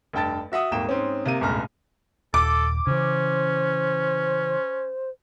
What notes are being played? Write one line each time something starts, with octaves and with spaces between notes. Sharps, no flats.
F1 G2 G5 A5 A6
F#4 E5 F#5 D#6
D#1 G#1 A#3 G5 E7
G#2 C4 C#4
C3 A#3 D#7
D1 G1 C#2 B2 A#5 F6
D#1 A4 D6
C#3 E3 C#4 C5